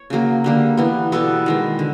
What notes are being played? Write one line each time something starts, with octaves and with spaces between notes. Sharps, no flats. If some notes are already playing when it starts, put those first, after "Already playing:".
Already playing: C#5
C#3 F#3 A#3
D3 G3 A#3
E3 G3 B3
B2 G3 B3 A4
D#3 G#3 B3
D3